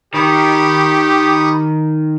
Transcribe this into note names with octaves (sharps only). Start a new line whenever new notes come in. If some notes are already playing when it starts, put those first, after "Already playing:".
D#3 G4 B5 C#6 D#6